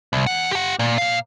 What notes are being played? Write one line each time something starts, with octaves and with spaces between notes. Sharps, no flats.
C2
E2 F#5
G4 F#5
A#2
A#2 F5